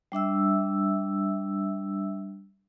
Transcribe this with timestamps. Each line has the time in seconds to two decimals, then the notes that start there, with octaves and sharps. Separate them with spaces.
0.12 G3 D4 E5 E6